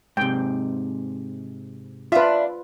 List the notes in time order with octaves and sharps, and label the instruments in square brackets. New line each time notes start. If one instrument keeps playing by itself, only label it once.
[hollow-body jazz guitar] G#2 C3 [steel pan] G5
[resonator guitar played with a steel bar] D4 E5 [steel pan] F4 B4